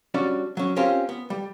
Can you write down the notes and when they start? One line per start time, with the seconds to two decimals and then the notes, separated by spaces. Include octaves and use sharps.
0.14 G3 C#4 D4 F#4
0.57 F#3 C#4
0.76 C4 C#4 F4 G4 A#4
1.09 B3
1.30 G3